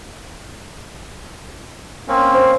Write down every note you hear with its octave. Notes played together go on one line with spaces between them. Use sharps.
A#3 C4 C#4
C5